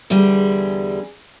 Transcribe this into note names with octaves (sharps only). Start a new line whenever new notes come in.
E2 D3 G3 G#4 G#5